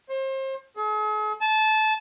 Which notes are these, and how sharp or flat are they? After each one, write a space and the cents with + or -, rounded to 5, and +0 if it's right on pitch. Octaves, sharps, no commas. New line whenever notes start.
C5 +35
G#4 +45
A5 -20